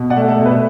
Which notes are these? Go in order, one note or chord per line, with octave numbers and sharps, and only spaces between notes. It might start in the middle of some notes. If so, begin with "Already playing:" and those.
Already playing: B2
D5 F#5
A3
A4
B2
B4